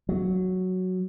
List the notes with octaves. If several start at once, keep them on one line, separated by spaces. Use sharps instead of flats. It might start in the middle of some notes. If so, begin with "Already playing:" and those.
F#3